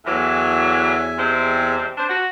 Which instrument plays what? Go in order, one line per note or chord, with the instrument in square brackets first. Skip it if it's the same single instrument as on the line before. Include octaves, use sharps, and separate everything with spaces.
[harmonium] E2 E5 G#5 [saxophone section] A2 E3 F#3
[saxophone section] C3 G#3 C4
D4 C5
F#4